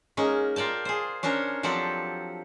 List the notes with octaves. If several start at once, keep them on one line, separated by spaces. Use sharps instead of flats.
G#3 A#3 C#4 D#4
F4 A#4 D5 G5 A5
G#4 C5
C#4 D4 A#4 C5 C#5
F3 F#3 C4 G4 A4 D5